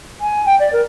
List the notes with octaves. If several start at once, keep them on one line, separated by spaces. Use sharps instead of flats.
G#5
G5
D5
A#4